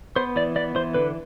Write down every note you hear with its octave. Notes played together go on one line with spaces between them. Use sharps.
B3 C5
E3 D5
B3 D5
E3 C5
D3 B4